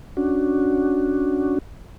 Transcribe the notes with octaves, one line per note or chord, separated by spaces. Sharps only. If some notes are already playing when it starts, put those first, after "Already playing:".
C#4 D4 F#4